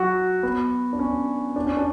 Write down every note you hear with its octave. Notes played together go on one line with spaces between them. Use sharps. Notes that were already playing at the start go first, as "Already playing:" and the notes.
Already playing: F#3 F#4
B3
D4
C#4
D4
C#4
D4